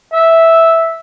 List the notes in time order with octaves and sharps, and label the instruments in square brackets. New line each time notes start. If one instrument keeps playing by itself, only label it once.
[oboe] E5